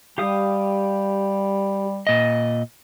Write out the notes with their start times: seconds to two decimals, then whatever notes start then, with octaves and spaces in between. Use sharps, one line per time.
0.18 G3 G4 F5 D#6
2.07 A#2 D#5